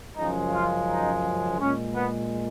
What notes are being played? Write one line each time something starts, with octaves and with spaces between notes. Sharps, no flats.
F#2 C#3 F3 G#3 D#4
F4
D#4
A#2 G#3 C#4
B3